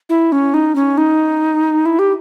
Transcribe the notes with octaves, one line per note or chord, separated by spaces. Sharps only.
E4
C#4
D#4
C#4
D#4
E4
G4